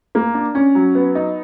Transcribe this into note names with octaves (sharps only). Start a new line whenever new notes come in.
A#3
D4
C#4
F#3
B3
D#4